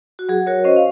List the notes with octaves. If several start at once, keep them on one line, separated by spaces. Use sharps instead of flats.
F#4
F#3 G#4
F#4 A#4 C#5
C#4 C5 D#5
F5